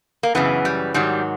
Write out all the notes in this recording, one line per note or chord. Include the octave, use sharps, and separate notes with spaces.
A#3
F#2 C#3 E3 B3
G3
G#2 D#3 F#3 G3